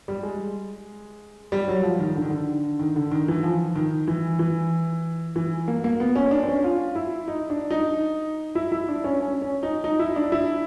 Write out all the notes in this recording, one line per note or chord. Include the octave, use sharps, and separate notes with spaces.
G3
G#3
G3
F#3
F3
D#3
D3
D#3
D3
D#3
D3
D#3
E3
F3
D#3
E3
E3
E3
A#3
A#3
B3
C#4
D4
C4
C#4
F4
E4
D#4
D4
D#4
E4
E4
D4
C#4
C#4
C#4
D#4
D#4
E4
D4
E4